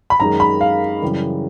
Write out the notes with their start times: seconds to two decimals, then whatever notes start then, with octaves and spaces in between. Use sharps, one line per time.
0.10 B5
0.20 F#2 D#3 G#3 A#5
0.40 B5
0.61 F5
1.02 F#2 C#3 E3 G3